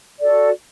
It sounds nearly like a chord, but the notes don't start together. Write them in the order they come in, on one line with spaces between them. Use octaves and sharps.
D5 A4 F#4